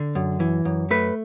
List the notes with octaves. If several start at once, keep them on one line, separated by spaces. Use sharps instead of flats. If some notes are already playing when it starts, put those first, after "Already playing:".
Already playing: D3
F#2
E3
F#2
A3 B4